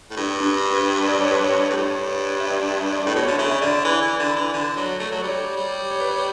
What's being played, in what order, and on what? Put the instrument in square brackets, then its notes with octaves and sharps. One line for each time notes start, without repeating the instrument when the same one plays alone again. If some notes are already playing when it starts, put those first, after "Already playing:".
[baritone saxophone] A2
G2
[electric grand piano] D4
B4
D5
C#5
B4
C#5
[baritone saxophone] A2
G2
[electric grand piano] E5
D5
E5
D5
[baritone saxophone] A2
[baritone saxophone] B2 [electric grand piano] C#5
[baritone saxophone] D3
[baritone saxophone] C#3 [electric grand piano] E5
[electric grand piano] E5
[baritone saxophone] D3 [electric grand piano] D5
[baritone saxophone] E3
E3
D3
E3
D3
F#3
A3
F#3
[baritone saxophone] G3 [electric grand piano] C#5
[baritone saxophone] G3
[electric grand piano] C#5
B4
C#5